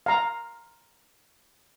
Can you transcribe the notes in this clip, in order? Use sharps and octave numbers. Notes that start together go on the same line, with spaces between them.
F5 A#5